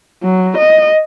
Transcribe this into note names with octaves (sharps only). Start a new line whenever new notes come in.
F#3
D#5